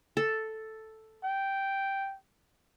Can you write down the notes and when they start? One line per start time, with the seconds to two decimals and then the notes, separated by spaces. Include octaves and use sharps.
0.17 A4
1.23 G5